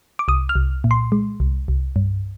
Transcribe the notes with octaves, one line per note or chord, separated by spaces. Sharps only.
D6
C2 D#6
F6
C2
A#2
C6
G#3
C2
C2
G2